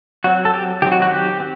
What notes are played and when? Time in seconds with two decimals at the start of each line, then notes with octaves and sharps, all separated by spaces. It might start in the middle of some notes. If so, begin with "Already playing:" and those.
0.24 F#3 C4 F#4
0.45 A4
0.54 G4
0.82 D#3 F#3 C4 G4
0.92 F#4
1.02 F#4
1.11 G4
1.40 C4